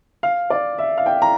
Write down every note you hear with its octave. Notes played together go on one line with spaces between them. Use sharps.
F5
D5
E5
F5
G5
A#5